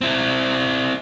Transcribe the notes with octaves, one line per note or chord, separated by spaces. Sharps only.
C4 E4